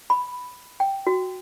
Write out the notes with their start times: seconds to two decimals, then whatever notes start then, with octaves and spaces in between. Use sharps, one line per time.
0.10 B5
0.80 G5
1.07 F#4